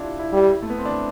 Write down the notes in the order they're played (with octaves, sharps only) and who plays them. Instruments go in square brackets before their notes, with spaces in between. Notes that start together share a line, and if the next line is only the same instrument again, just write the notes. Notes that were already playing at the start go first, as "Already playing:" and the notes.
Already playing: [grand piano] D4 E4 F4 G4
E4
[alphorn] G3 [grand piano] E4
[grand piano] A3
B3
C4
D4